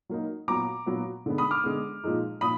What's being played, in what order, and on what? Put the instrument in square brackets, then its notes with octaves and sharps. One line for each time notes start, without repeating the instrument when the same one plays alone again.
[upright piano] F#3 A#3 D#4
A#2 F#3 B3 A#5 D6
A#2 F#3 B3
D3 G#3 B3
B5 D#6
D6 F6
D3 G#3 B3
A#2 F3 G#3 D#4
A#2 F3 B5 D#6